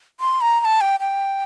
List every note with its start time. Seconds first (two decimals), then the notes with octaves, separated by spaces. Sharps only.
0.20 C6
0.41 A#5
0.61 A#5
0.65 A5
0.81 G5
1.00 G5